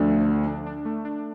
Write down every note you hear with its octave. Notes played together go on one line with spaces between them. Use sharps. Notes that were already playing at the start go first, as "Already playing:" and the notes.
Already playing: D2 D3 F3
A3
F3
D4
D4
A3
D4